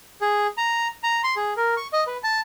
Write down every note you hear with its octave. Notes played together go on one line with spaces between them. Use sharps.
G#4
A#5
A#5
C6
G#4
A#4
C#6
D#5
B4
A5